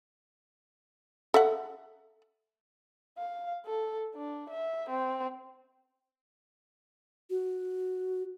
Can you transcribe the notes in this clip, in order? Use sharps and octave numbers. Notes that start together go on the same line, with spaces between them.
A4 E5 F#5
F5
A4
D4
E5
C4
F#4